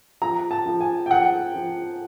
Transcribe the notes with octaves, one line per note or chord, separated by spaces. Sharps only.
F3 A#5
A5
F3
G#5
G5
F3 F#5
F3